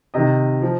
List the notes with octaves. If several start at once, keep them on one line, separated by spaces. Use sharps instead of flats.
C3 D#3 D#5
F3